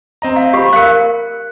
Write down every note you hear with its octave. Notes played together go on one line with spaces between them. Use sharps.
C4 D#5 A#5
F5
G4 C5 B5 D6 B6
A#4 F5 F#6 C#7